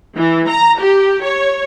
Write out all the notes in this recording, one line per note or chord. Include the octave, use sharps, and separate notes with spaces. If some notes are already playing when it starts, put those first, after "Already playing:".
E3
A#5
G4
C#5